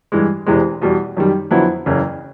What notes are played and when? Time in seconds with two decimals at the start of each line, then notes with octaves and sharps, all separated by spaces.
0.12 G2 E3 G#3
0.46 E1 E2 C3 E3 G#3
0.82 E2 B2 G3
1.17 F#2 D#3 G3
1.51 F2 D3 F#3 B3 E4
1.86 F#1 E2 C#3